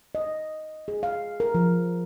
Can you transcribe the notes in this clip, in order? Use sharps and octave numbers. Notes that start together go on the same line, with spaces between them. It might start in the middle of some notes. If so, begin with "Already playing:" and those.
D#5
G#4
F5
A#4
F3